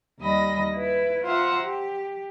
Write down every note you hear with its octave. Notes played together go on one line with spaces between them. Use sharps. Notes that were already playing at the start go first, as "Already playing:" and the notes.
D#2 G3 D#5 B5 A#6
E4 B4
F4 C5 E5 F#5 A#5
G4